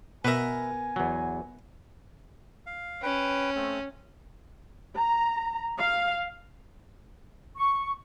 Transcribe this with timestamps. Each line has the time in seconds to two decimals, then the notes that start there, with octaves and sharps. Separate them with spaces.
0.25 B2 B3 A#4 B4 E5 G#5
0.96 E2 F#3
2.67 F5
3.02 C#4 B4 G5
3.56 A3 C4
4.99 A#5
5.78 F5
7.56 C#6